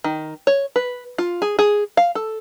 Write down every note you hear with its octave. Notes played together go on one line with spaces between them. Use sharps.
D#3
C#5
B4
F4
G#4
G#4
F5
A4